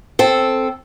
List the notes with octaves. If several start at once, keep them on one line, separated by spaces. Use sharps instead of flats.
C4 A4